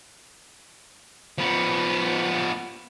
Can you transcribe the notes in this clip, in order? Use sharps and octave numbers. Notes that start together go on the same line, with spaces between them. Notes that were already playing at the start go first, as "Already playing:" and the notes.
F3 B3